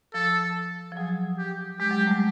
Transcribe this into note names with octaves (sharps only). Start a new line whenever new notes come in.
F3 A4
F3
F#3 G#4
G4
G#3 G4
F#3
G3
A3
G#3